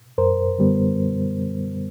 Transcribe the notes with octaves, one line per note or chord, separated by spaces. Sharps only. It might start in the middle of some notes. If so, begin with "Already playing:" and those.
F#2 A#4 C5
D3 G3 B3